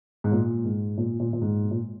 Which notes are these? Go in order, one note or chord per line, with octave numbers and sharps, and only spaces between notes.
G#2
A#2
G#2
A#2
A#2
A#2
G#2
B2
A#2